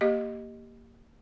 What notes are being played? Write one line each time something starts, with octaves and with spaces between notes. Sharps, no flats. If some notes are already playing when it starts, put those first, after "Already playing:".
A#3 G4 D#5